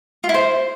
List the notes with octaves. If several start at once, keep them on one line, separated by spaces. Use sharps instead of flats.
F4
E4
C5